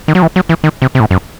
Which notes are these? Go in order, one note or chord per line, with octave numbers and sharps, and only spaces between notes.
D#3
F#3
E3
F#3
E3
D#3
C3
C3
A2
F#2